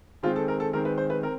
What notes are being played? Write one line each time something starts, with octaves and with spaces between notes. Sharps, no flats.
D#3 G#3 C4 F4
A4
A#4
A4
D#3 G#3 C4 A#4
B4
C5
B4
C4 A#4